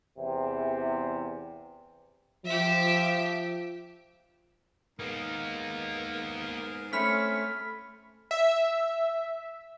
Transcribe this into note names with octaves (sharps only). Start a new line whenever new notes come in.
E2 C3
F3 G4 E5
G#2 A#3 B3 D#4 A#4
A3 C4 C#4 B5 F6 B6
E5